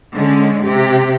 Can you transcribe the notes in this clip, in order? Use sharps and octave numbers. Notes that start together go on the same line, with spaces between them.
D3 G#3 C#4
C3 G4